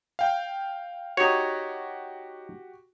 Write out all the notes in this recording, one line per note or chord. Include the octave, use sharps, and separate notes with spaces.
F5 G5
D#4 F#4 G4 C#5